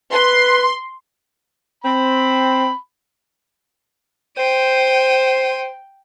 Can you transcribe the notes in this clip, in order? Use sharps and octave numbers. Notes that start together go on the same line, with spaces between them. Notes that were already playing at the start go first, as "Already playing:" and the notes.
B4 C6
C4 B5
C5 G5 D#7